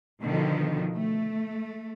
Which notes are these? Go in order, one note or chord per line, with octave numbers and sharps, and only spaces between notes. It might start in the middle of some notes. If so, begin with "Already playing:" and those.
B2 D3 D#3 F3
A3